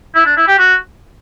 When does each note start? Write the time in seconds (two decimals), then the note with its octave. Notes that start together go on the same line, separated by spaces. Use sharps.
0.15 E4
0.26 D4
0.37 E4
0.47 G4
0.58 F#4